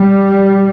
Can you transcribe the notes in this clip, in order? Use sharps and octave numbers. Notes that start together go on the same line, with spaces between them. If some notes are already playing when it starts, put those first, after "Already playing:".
Already playing: G3